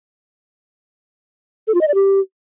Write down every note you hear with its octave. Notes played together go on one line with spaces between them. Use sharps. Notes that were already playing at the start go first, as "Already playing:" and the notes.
A4
F4
D#5
D5
G4